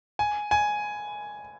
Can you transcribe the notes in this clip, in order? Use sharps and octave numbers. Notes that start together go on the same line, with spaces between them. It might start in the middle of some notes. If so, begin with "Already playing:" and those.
G#5
G#5